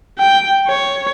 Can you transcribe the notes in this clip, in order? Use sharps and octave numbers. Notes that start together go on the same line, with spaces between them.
G5
C#5